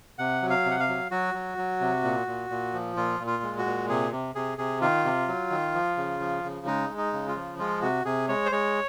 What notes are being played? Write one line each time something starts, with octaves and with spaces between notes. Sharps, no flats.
C3 F#5
F#3
F5
C3
F#5
F5
F#3
F#3 F#4
F#3
F#3
C3
A#2
A#2
A#2
F3
A#2 F4
A#2
F4
G#3
F#4
A#2
C3 G#4
C3
C3 G#4
C3 G#4
D#3 F4
C3
F#3
D#3
F3
C#3
F3
C#3
G#3 D#4
G#3
D#4
C#3
F4
F3
G#3 F4
C3 F#4
C3 G#4
G#3 C#5
C5
G#3 C#5